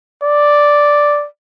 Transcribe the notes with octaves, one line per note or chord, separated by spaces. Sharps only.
D5